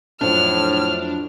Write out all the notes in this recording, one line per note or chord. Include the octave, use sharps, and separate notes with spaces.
F2 A2 F3 F#3 D4 F6